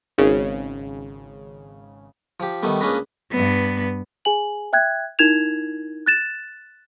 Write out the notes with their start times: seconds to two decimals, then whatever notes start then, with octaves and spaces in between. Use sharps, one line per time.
0.18 G#1 C#3
2.40 F3 G4
2.63 D#3 G3 A3 B3
2.81 C#2 A#3 C#4 D4 B4 D#5
3.32 G2 B3
4.25 G#4 G#5 F#7
4.73 E5 G5 F#6 G#6
5.19 D#4 E4 A#4 G#6 E7 F7
6.06 F#6 A6 E7